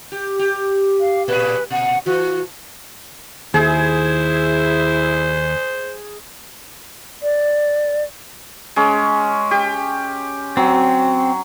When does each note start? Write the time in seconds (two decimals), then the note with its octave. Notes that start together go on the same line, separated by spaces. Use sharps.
0.12 G4
0.39 G4
1.00 F5
1.28 A2 G#4 B4
1.70 A#2 F#5
2.06 E3 F#4
3.54 D#2 E4 G#4 C5
7.22 D5
8.76 G#3 C#4
9.51 G4
10.57 F#3 C4